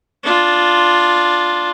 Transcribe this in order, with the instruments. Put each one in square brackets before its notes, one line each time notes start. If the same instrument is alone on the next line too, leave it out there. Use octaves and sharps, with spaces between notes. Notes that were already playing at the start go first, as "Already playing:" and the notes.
[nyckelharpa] D4 F4